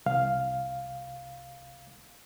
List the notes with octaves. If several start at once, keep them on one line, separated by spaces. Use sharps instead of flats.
C2 F5